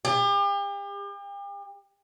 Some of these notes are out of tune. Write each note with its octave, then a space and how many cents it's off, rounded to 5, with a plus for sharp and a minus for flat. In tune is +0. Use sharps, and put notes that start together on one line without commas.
G4 +40